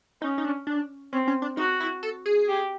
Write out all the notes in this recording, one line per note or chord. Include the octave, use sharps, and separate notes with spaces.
C#4 D#4
D#4
D4
D4
C4 C#4
C#4
D4
D#4 F#4
E4
A4
G#4
G4